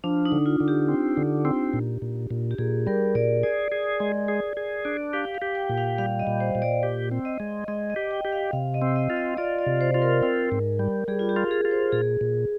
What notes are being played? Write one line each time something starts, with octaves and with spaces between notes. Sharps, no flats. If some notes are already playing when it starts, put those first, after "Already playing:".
F3 D4
D#4
D3
F4
D3
G4
C4
D3
C4
A#2
A#2
A#2
G4
A#2 G#4
G3 A#4
A#2 D5
G#4 D5
G#4
G#3
G#4
G#4
D4
G4 F5
F5
G4
G5
A#2
F5
G3 F5
D#5
A#2
C5
A#2
D5
G4
C4
D#5
G#3
G#3 D#5
D#5
G4
G5
G4
F5
C3 F5
D#5
C4
D#5
F4
D#5
F4 D5
D5
C3
C5
F4
A#4
C4
G#2
G3
G3 G#4
F4
G4
F4
G#4
F4
C5
A#2 G#4
A#2